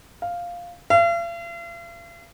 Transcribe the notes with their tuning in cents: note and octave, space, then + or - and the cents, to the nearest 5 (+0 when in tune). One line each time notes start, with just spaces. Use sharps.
F5 +0
F5 -45